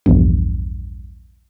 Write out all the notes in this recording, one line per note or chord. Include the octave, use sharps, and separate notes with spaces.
A#1 E2 G2